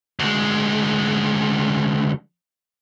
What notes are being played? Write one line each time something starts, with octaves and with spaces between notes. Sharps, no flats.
D2 G#3